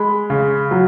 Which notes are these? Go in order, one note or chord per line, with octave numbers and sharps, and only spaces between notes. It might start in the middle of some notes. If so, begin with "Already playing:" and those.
Already playing: G#3 B5
C#3
F#3